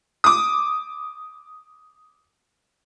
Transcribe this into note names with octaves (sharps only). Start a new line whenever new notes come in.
D6 D#6